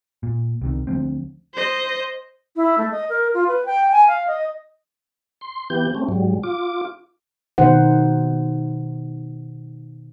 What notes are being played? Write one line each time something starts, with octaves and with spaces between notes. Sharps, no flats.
A#2
C2 C3 D#3
D2 F3 G#3 C4
C5 D#5
E4
A3
D#5
A#4
F4
B4
G5
G#5
F5
D#5
C6
E3 B3 G4 G6
A3 C4 C#4
G#2 F#3 G3
F4 D6
B2 D#3 D#4 C5 F#5